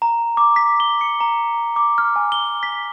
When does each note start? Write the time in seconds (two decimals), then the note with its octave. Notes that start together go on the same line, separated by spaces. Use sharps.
0.02 A#5
0.37 D6
0.56 B6
0.80 G7
1.01 C#7
1.21 A#5
1.76 D6
1.98 F6
2.16 G#5
2.32 G7
2.63 B6